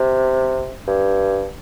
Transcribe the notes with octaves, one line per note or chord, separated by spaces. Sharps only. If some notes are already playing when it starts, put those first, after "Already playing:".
Already playing: C3
G2